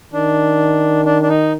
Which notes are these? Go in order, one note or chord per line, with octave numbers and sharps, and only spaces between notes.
D#3 D4
D4
D4
D#4